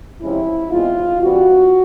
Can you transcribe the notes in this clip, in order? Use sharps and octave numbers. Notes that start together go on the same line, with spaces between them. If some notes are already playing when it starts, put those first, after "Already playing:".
F2 C3 F3 G#3 C#4 E4
E2 B2 G#3 C4 F4
G2 E3 G3 C4 F#4